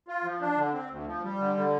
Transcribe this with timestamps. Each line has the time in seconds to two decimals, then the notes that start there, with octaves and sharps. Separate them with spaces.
0.08 F4
0.24 F3
0.41 D4
0.57 D3
0.73 C4
0.90 D2
1.07 F3
1.23 G3
1.40 D3
1.57 D3